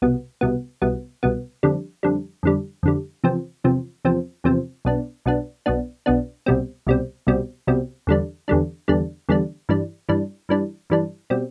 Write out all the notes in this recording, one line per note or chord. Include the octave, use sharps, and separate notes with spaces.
C2 B2 B3
C2 B2 B3
C2 B2 B3
C2 B2 B3
F2 D3 G3
F2 D3 G3
F2 D3 G3
F2 D3 G3
E2 C3 F3 C4
E2 C3 F3 C4
E2 C3 F3 C4
E2 C3 F3 C4
B1 B2 B3 D4
B1 B2 B3 D4
B1 B2 B3 D4
B1 B2 B3 D4
C2 B2 G3 C4
C2 B2 G3 C4
C2 B2 G3 C4
C2 B2 G3 C4
E2 D3 G3 D4
E2 D3 G3 D4
E2 D3 G3 D4
E2 D3 G3 D4
G2 E3 G3 D4
G2 E3 G3 D4
G2 E3 G3 D4
G2 E3 G3 D4
B2 G3 C4